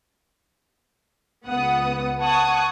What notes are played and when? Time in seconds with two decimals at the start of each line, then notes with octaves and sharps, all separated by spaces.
1.46 C#2 B3 F#5 D#6
2.20 F#5 A5 C#6 D#6 F#6 G#6